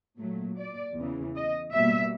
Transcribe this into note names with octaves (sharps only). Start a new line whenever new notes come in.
A#2 F#3 A3
D5
E2 C#3 E3
D#5
B2 G3 A#3 E5